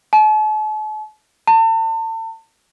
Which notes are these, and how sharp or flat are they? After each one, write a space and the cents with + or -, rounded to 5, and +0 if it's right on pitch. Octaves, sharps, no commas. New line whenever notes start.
A5 -45
A5 +35